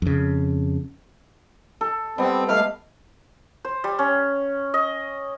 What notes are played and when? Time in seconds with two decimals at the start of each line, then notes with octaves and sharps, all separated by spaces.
0.02 F2 C#3
1.81 A4
2.18 G3 B3 C4
2.48 G#3 A3 F5 B5
3.65 C5
3.84 G3
3.99 C#4
4.74 D#5